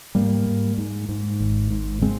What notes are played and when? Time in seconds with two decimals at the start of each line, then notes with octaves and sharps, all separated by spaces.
0.15 G#2 G3 A#3
0.47 G#2
0.78 G#2
1.09 G#2
1.40 G#1
1.71 G#2
2.01 C#3 G#3 C4